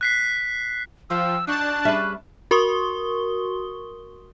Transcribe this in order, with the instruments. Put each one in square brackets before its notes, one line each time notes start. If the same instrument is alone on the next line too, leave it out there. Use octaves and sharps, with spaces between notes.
[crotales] F#6 B6 C7
[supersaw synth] F3 [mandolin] G4 C5 F5 [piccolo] E6
[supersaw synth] D4 A5 [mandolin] D#4 F#4 [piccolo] F#6
[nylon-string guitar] G3 E5 [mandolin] C#4 G#4 B4
[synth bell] F#4 A#4 C6 C#6 D#6 G7